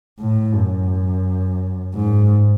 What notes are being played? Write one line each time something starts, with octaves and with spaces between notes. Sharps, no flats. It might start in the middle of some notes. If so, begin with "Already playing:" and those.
A2
F#2
G#2